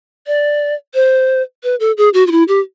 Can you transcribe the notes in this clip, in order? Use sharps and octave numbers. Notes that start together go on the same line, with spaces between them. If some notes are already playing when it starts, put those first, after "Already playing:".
D5
C5
B4
A4
G#4
F#4
F4
E4
G4